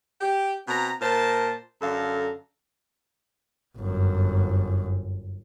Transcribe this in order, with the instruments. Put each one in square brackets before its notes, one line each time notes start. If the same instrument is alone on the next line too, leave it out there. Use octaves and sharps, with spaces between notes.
[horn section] G4
B2 C4 A#5
A#2 A#4 C5 A5
F#2 D3 A4 F5 A#5
[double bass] G1 F#2